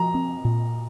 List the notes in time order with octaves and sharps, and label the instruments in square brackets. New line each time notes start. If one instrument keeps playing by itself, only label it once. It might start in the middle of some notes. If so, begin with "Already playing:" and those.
Already playing: [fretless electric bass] F3 [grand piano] A#5
[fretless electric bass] C4
A#2